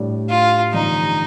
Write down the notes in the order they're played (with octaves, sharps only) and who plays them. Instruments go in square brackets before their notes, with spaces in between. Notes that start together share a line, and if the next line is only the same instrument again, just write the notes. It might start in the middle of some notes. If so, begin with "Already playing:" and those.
Already playing: [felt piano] A2 G3 D4 G4
[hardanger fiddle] F4
[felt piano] A1 G2 D3 F3 [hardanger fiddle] D#4